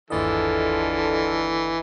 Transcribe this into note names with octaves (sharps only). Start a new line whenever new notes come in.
G1 D#2 D3 E3 G#3 F4 A4 D#5